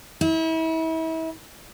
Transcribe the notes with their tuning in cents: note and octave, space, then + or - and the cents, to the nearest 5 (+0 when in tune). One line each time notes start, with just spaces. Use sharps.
E4 -35